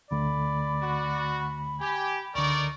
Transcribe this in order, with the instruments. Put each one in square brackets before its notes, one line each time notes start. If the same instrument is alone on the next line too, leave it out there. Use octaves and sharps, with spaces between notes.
[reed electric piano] D2 D3 A3 [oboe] D5 [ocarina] B5
[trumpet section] F#4
[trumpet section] G4 [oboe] G#5
[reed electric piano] C#2 D3 [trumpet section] D#4 A#4 D5 [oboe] C#6